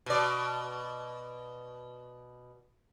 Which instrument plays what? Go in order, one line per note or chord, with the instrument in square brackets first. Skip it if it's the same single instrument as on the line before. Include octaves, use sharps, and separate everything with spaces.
[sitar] B2 D5